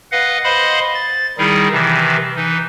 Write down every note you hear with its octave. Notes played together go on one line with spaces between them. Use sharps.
B4 D#5 F5 F#5
C5 D#5 F5 F#5 B5 C6
A6
D#3 G3 D#4 E4 G#4
C3 D#3 E3
E3 D#4